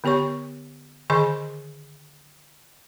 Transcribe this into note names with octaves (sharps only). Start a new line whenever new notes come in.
D3 B3 G4 C#5 C#6
D3 D#3 G#4 D#5 G#5 C6